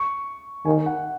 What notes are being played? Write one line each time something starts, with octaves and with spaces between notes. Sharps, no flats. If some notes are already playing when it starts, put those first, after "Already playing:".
Already playing: C#6
D#3 G#5
F#5